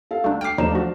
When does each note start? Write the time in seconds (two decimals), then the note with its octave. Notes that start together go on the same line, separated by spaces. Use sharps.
0.11 A4 F5
0.24 D2 A3 D4
0.41 G5 D6 F6 C7
0.58 D#2 F3 A3 D4 D#4 C5 E7
0.75 F#4